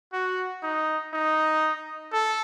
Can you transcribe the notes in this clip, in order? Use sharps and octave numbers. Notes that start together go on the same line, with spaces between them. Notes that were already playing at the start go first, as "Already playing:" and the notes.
F#4
D#4
D#4
A4